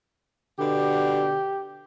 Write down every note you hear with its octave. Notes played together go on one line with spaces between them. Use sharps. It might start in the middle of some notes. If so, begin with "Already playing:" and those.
B2 D3 G4